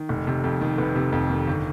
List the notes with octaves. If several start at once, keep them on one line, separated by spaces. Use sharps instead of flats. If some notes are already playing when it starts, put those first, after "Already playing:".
Already playing: D#3
F1
C3
F2
D#3
F1 B4
C3
F2
D#3
G1